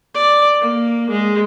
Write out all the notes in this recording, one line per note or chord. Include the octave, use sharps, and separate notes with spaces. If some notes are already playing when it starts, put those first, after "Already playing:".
D5
A#3
G#3